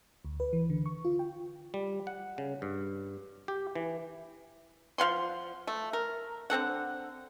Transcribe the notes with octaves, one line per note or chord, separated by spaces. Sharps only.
D2
B4
E3
D3
C#6
F4
G5
G3
F#5
C#3
G2
G4
E3
F3 F5 F#5 C6
A3
A#4
D3 C4 A4 F#5